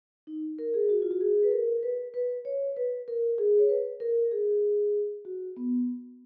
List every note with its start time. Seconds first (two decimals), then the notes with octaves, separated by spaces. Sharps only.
0.27 D#4
0.59 A#4
0.74 G#4
0.89 F#4
1.02 F4
1.11 F#4
1.21 G#4
1.43 B4
1.51 A#4
1.83 B4
2.14 B4
2.45 C#5
2.77 B4
3.08 A#4
3.38 G#4
3.59 C#5
3.69 B4
4.00 A#4
4.32 G#4
5.25 F#4
5.57 B3